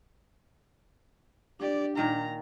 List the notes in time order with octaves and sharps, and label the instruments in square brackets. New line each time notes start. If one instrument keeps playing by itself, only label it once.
[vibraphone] D4 [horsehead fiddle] G4 D5
[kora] A#2 D#3 [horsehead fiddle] A#5